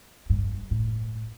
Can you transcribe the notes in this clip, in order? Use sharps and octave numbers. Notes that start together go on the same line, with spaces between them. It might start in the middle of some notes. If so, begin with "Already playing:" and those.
G2
A2